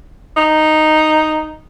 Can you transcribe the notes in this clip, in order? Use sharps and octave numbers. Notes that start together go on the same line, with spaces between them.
D#4